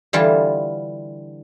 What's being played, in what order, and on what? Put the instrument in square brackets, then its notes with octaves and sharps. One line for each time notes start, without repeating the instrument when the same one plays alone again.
[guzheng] D3 E3 G3 F4 A5